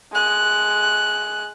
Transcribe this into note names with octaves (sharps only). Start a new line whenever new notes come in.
G#3 F#6